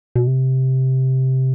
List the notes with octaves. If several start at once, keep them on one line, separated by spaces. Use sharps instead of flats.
B2
C3